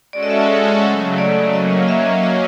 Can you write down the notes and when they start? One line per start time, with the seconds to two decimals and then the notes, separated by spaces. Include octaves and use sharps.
0.13 G#3 C#4 F#4 A4 D5
0.23 D#5
0.30 E5
0.39 D#5
0.83 C#3 F#3 A3
1.18 D5
1.53 F#3 A#3 C#4 D#5
1.71 D#5
1.89 E5
2.06 D#5
2.23 D#5